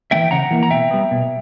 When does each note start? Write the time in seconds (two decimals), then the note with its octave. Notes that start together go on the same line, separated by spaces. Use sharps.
0.11 A#3 E5 G5
0.15 E3
0.31 C#3 F#5 A#5
0.51 E3 A#3
0.63 A#5
0.71 B2 E5 G5
0.91 G3 B3
1.11 B2